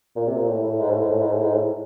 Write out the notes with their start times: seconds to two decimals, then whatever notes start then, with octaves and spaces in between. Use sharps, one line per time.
0.16 A#2
0.27 C3
0.36 A#2
0.48 A2
0.63 A2
0.80 G#2
0.90 A2
1.01 G#2
1.11 A2
1.21 G#2
1.32 A2
1.42 G#2
1.53 A2